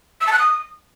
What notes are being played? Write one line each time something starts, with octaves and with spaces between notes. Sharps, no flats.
E6
A5
F#6
D#6